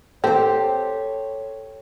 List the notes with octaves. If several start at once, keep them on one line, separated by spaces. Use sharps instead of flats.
C4 G4 A4 C5 C#5